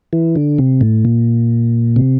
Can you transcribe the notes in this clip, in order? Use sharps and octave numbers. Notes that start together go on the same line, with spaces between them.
E3
D3
C3
A2
A#2
C3